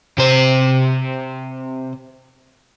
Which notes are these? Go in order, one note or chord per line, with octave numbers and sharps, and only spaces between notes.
C3 C5